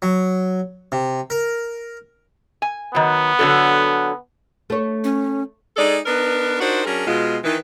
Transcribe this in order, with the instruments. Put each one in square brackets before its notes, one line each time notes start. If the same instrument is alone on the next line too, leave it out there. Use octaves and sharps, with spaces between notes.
[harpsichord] F#3
C3
A#4
[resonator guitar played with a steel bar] G#5
[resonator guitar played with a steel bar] D#3 F#3 [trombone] B3
[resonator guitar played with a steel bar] D3 F#3 A4
[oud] A3 C#5
[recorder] C#4
[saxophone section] G#3 D#4 G#4 A4 D5
B3 D4 D#4 A#4 B4
D4 D#4 F4 F#4 A#4 C5
F#3 C#4 D4 G#4 A#4
B2 G#3 F4
D#3 E3 B4